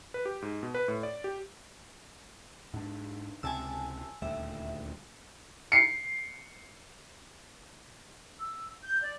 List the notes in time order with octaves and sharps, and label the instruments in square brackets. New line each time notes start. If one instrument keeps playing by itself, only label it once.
[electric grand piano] B4
G4
G#2
B2
B4
A2
D5
G4
[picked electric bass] G#2 D4
[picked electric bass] C#2 C3 [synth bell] G#5 A5 E6
[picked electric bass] D#1 D2 G3 [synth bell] E5
[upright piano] C7 C#7
[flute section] E6
G6
D5